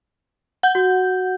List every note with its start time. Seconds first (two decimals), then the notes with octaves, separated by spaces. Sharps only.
0.63 F#5 G6
0.75 F#4